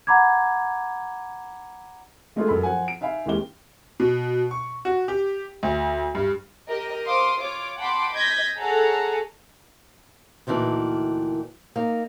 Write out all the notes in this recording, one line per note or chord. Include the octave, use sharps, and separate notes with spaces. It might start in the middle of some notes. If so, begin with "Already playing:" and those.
F#5 A#5 B5 D6 G#6
G#3 A3 D4 F4 G#4 B4
F#2 A4 B5
F3 C5 F#5 G#5
D7
D#4 E5 F5 G#5 B5
D#2 E3 G#3 C#4 G4 G7
B2
C#6
F#4
G4
D2
G2
G4 A#4 D#5
C5 F5 C6 D6 D#6
F4 C#5 D6
F#5 G5 A5 B5 C6 D6
D#5 G6 G#6 A#6 B6
G#4 A4 C#5 F#5 G#5 A#5
D2 A#2 D#3 E3 D4
A#3 D#4